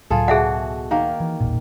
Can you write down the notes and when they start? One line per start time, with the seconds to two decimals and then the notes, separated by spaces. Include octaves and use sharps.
0.10 C#2 A2 F#3 F4 G#4 A4
0.28 B2 F#4 G#4 E5 F#5
0.91 D#3 A#3
1.20 E3
1.41 E1 A1 A#2